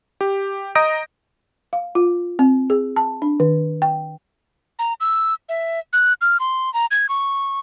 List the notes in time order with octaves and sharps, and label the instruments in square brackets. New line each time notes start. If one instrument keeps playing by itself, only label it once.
[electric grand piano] G4
D#5 A#5 D#6 G6 A#6 D7
[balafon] F5
F4
C4
G#4
A5
D4
D#3
G5
[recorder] A#5
E6
E5
F#6
F6
C6
A#5
G#6
C#6